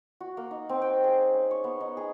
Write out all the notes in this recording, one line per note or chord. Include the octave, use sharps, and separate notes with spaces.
F#4
A#3
D#4
C4
G5
G#4
C#4
C#5
B3
D#4
G#4